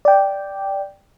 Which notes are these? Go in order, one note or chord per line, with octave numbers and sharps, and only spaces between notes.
D5 G5